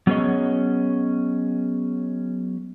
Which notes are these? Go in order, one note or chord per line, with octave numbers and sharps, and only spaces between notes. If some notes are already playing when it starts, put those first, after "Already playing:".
F#3 B3 C#4 G#4 C#5 D#5